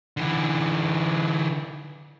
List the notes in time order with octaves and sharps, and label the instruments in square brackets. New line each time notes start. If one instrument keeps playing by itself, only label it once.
[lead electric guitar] D3 E3